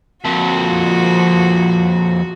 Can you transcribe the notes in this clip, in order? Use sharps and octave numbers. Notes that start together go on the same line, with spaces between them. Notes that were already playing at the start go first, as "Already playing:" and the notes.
F2 A#2 F3 F#4